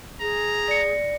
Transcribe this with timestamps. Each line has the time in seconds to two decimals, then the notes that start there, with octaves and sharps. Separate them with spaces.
0.21 G#4 A#5
0.68 D5 A#6 C#7